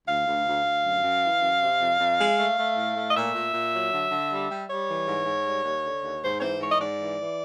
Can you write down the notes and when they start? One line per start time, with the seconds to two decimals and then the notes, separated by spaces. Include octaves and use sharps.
0.07 D2 F5
0.26 D2
0.45 D2
0.65 D2
0.84 F#2
1.04 F#2
1.23 E3
1.41 F#2
1.60 C3
1.81 F2
2.00 F2
2.18 G#3
2.38 A3
2.57 A3
2.76 A2
2.96 A3
3.09 D#5
3.15 A#2 E5
3.34 A#2
3.53 A#2
3.72 F#3
3.92 D3
4.10 D3
4.31 G3
4.49 G3
4.69 G3 C#5
4.88 E3
5.07 G#2
5.26 G#2
5.45 G3
5.64 D#2
5.84 D3
6.03 D#2
6.22 G#2 C5
6.37 C#5
6.41 E3 C5
6.60 G#2 C#5
6.71 D#5
6.80 G#2 D5
6.98 E3
7.18 E3